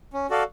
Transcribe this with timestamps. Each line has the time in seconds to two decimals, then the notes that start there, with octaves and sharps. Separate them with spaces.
0.13 C#4
0.30 F#4 A4 D5 F5